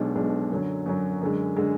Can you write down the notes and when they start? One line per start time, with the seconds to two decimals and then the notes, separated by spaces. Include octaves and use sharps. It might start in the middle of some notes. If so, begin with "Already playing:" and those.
Already playing: B1 B2 G#3 D4
0.15 B1 B2 G#3 D4
0.51 F#2 D3 F#3
0.86 F#2 D3 F#3
1.21 F#2 D3 G#3
1.57 D3 G#3